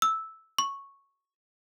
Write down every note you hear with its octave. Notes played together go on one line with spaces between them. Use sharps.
E6
C#6